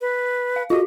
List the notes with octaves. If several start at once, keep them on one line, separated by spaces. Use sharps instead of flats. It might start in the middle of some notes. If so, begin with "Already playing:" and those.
B4
F5
F4 F#4 D#5